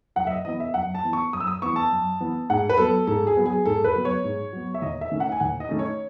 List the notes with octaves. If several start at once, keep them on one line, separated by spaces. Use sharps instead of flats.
F#2 F#5
E5
D#5
E3 B3 D#5
E5
F#2 F#5
A5
E3 B3
C#6
F#2 D#6
E6
D#6
E3 B3 C#6
A5
F#2
E3 B3
G#2 F#5
B4
F#3 B3 A4
G#2 A4
G#4
F#3 B3
G#4
G#2 A4
B4
F#3 B3
C#5
G#2
F#3 B3
E5
D#2 D#5
E5
D#3 A3 C#4
F#5
G#5
D#2 F#5
D#5
D#3 A3 C#4
C#5